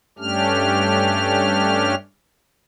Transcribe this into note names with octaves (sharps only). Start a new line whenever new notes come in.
G2 A3 C#4 D4 G4 F6